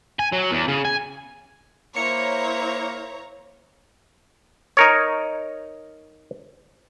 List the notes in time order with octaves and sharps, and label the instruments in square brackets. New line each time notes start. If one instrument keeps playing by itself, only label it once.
[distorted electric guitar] G#5
F#3
E2
C#3
G#5
[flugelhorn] A#3 [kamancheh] E4 C5 [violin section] C#5 A#5 [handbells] C#7
[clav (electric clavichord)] D#4 A#4 C#5